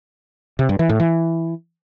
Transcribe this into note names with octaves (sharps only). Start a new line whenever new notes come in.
C3
G2
E3
A2
E3